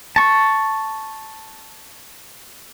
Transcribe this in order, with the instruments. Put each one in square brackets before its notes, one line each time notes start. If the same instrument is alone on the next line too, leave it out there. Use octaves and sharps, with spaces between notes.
[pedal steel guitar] A5 C#6